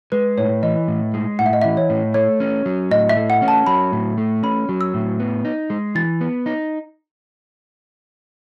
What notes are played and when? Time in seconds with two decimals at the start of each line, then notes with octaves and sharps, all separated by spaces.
0.12 G#3 B4
0.38 A2 C#5
0.63 E3 D#5
0.88 A2
1.14 G#3
1.39 A2 F#5
1.46 E5
1.53 D#5
1.62 E5
1.65 E3
1.77 C#5
1.90 A2
2.14 A3 C#5
2.40 C#4
2.66 F#3
2.91 A2 D#5
3.09 E5
3.17 A3
3.30 F#5
3.42 C#4
3.48 A5
3.67 F#3 B5
3.92 A2
4.18 A3
4.43 C#4 B5
4.69 F#3
4.81 E6
4.94 A2
5.19 B3
5.45 D#4
5.70 G#3
5.95 E3 A6
6.21 B3
6.46 D#4